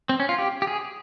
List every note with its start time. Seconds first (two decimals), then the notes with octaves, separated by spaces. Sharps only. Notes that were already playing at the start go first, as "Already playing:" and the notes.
0.09 C4
0.20 C#4
0.29 F4
0.39 G4
0.62 G4
0.67 G#4